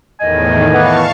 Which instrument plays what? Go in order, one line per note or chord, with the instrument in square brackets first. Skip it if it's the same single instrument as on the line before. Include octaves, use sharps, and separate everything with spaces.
[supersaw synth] E2 A2 D#3 [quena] D#5 [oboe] G#5
[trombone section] E3 B3 [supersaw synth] F5 A5 C#6